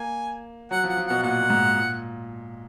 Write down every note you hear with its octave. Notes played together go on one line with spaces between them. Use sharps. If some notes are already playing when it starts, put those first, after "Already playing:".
Already playing: A#3 G#5
F#3 F#5
F3
F#5
F3
B2 F#5
A#2 F#5
A#2
G#2
A#2